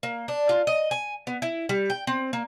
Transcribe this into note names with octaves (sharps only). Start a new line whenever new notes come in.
A#3
D4
F4
D#5
G#5
B3
E4
G3
G5
C4
A#3